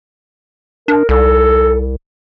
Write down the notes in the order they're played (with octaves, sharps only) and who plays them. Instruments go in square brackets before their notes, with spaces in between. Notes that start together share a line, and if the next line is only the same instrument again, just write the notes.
[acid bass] D4 [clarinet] A#4
[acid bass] C2 [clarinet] A4